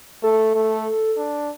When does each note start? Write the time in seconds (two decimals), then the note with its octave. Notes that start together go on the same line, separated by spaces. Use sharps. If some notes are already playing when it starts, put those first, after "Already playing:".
0.23 A3 A4
0.55 A3
1.17 D4